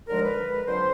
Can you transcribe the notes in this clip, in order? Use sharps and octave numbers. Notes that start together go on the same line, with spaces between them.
D#2 D3 F3 G#3 A#4
B4
F2 D3 F#3 C5